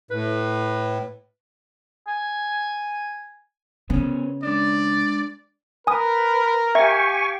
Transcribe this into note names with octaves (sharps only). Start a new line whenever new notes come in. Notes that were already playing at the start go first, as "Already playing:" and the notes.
A2 B4
G#5
C#3 B3 C#4
G#3 D4 D5
A#4 B4 G#5 D#6
G4 E5 F5 G5 G#5 C#6